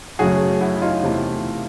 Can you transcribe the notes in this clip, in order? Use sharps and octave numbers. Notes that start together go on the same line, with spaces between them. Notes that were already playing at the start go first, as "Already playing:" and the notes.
F#2 C#3 F#3 A3 F#4 G#4
E4 F#4
E4
D#4 F4
E2 C3 E3 A3